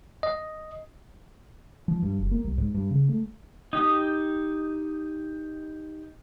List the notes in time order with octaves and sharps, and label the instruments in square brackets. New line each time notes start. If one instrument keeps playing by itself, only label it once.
[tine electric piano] D#5
[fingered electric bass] F3
G2
F#1
A#3
C2
G#2
G2
C#3
A3
[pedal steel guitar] D#4 G4 D#6